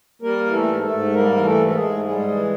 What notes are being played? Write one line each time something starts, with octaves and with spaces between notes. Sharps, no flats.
G3 A#3 A#4
E3
A3 A4
G#2
A3 A4
G#2
G3 A#3 A#4
E3
A3 A4
G#2
A4
G#3 G#4
G#2
G3 G#3 G#4
E3